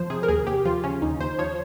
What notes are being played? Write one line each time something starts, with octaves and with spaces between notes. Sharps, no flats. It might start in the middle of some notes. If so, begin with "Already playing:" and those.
Already playing: F2 F3 C5
C3 G#4
A#4
D#2 G#4
D#2 G4
F3 F4
C#3 C#4
D#2 D#4
D#2 C5
F3 C#5